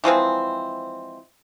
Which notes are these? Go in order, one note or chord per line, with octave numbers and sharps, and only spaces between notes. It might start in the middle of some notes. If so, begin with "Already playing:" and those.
E3 F3 G#3 C4